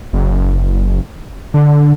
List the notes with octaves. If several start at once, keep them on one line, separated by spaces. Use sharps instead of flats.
F#1
D3